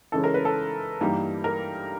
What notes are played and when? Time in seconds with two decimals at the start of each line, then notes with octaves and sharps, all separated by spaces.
0.12 C#3 E3 G#3 C#4 A4
0.24 A#4
0.34 B4
0.45 A4
1.01 G2 E3 G3 A#3 D#4
1.44 A#4